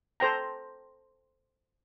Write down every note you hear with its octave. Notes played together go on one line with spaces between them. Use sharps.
A4 C5 G5 A#5